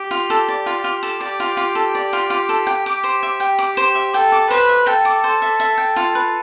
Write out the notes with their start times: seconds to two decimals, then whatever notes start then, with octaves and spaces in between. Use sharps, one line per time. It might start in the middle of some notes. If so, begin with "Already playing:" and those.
Already playing: G4
0.11 F4
0.30 A4
0.48 D5
0.66 F4
0.84 F4
1.03 A4
1.21 G4 D5
1.40 F4
1.57 F4
1.75 A4
1.95 D5
2.13 F4
2.30 F4
2.49 A4
2.67 G5
2.86 D6
3.04 C5
3.23 E5
3.40 G5
3.59 D6
3.77 C5
3.95 E5
4.14 A4 G5
4.32 D6
4.50 B4 C5
4.69 E5
4.86 A4 G5
5.05 D6
5.24 C5
5.42 E5
5.60 E5
5.78 G5
5.96 F4
6.15 B4